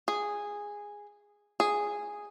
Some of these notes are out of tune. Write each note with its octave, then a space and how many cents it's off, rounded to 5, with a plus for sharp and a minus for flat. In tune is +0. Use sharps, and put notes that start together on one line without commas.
G#4 -10
G#4 -5